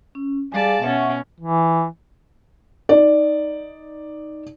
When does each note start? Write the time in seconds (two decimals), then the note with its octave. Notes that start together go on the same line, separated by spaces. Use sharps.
0.15 C#4
0.52 G3 G#4 D5 F5 G#5 A5
0.82 B2 C#4 E5 F#5 C#6
1.40 E3
2.89 D#4 D5